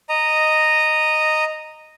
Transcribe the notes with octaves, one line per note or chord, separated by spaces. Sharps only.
D#5 A#5